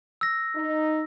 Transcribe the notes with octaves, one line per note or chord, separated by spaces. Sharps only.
E6 A#6
D#4